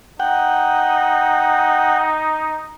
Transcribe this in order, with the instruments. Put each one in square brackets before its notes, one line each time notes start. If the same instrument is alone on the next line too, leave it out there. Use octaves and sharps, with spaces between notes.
[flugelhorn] D#4 [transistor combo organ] F#5 G5